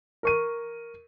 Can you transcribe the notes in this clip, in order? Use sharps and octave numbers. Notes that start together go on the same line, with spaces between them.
A#4 C#6 D#7